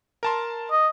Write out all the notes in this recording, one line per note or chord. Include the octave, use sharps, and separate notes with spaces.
A#4 A5 C6
D#5